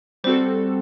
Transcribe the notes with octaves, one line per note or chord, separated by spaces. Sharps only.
G3 C4 F#4 A4 C5